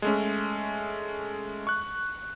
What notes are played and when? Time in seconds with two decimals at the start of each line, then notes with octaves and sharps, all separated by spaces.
0.02 G#3 A3 C#4
1.67 C#6 F#6